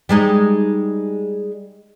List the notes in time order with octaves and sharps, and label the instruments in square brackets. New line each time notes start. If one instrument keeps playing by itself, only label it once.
[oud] G3 G#3 D#4